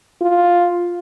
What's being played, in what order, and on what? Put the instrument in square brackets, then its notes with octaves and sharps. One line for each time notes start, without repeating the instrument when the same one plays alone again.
[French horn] F4